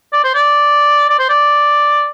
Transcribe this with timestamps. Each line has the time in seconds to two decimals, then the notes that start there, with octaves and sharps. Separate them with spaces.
0.13 D5
0.24 C5
0.35 D5
1.09 D5
1.19 C5
1.30 D5